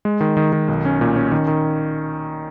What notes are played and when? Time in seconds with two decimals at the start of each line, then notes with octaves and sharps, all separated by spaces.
0.05 G#3
0.21 D#3
0.37 D#3
0.53 D#3
0.68 B1
0.85 C#4
1.01 A#2
1.16 C#4
1.32 D#3
1.47 D#3